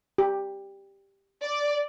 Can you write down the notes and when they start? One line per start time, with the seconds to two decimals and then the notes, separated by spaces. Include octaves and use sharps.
0.18 G4
1.44 D5